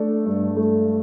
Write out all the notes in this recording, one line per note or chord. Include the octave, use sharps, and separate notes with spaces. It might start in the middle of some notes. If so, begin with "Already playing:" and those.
Already playing: A3 D4
G2
A3